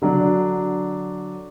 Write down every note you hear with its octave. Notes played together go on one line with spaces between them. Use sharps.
D3 F#3 D4